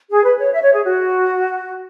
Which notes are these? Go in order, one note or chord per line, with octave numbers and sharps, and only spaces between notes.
G#4
B4
C#5
E5
C#5
G#4
F#4